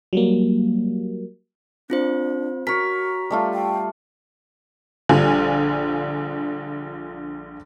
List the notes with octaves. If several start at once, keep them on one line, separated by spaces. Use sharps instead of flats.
F#3 G3 A#3
C4 D4 F4 C5
F#4 A#4 C#5 B6
G3 A3 F4
G5
A#1 D3 F3 G3 F4 G#5